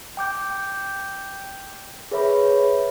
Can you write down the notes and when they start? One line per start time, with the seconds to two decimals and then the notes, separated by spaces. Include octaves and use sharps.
0.17 G5 D6 G6
2.11 G#4 B4 C#5 E5 B5